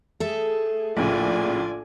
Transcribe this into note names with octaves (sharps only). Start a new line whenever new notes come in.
A3 G#4 A4 E5
A#1 A2 C#3 D4 F4 D5 G#5